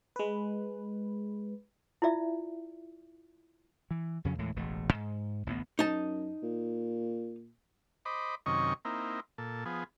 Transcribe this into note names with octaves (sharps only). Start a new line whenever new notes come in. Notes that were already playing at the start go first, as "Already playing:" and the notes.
G#3 B4
E4 F4 D5 E5
E3
F2 C#3 F#3 C#4
D#2 A2 E3 G#3
E1 A1 A3
G#2
A1 D2 A3 B3
F#2 D#4 A5
A#2
C5 D#5 B5 D6
F#2 C3 D#3 C#4 D#5 C#6
A#3 C4 D#4 E4
A#2 A4
F3 B3 G#4